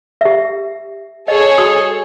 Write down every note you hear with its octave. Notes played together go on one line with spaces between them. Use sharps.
G4 E5
G#4 A4 C#5 D#5
F#4 D#6